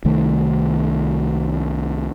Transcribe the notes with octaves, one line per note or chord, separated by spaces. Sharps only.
C2 D#3 A3